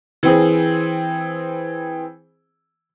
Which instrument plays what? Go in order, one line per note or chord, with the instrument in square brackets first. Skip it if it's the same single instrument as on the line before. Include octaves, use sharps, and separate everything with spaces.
[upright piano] E3 C4 G#4